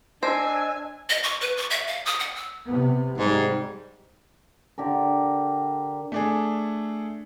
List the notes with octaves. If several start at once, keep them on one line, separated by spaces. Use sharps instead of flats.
D4 C5 D#5 G#5 E6
D#5
C#6
B4
C#6
E5
F5
D#6
F#5
E6
C3 B3
G#2 G3
D3 G4 A#4
A3 D4 G#4